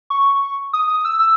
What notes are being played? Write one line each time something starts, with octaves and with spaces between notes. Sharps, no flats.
C#6
D#6
D#6
E6
E6